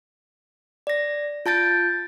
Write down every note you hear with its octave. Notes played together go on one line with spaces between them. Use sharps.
D5 A#6
F4 A5 G6 A6 D7